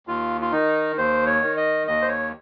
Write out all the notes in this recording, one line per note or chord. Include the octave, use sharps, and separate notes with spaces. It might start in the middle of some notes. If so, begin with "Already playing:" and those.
D#2 F4
F4
D#3 D#4
D#2 C5
C#5
D#3
D#5
D#2 D#5
C5
C#5